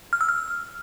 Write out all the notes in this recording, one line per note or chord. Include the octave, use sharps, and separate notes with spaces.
F6
E6
F6